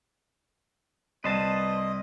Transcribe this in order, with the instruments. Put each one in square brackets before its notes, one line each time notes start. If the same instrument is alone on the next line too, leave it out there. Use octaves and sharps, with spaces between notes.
[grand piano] C2 [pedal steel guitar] B4 C5 A5 [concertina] D#5